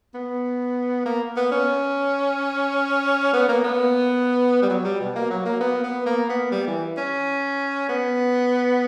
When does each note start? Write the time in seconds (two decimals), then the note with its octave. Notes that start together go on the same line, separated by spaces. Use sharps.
0.14 B3
1.06 A#3
1.36 B3
1.52 C#4
3.33 B3
3.48 A#3
3.64 B3
4.62 G3
4.70 F#3
4.85 G3
5.00 B2
5.16 A#3
5.30 F#3
5.45 A#3
5.60 B3
5.83 B3
6.06 A#3
6.30 B3
6.52 G3
6.67 E3
6.97 C#4
7.89 B3